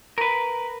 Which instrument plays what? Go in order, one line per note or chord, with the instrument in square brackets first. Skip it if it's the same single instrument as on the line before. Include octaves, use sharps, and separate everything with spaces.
[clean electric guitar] A#4 B4